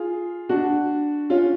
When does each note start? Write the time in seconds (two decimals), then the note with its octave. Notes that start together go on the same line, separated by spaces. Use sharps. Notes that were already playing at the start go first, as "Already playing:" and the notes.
Already playing: F4 G#4
0.49 D4 F#4
1.30 C#4 F4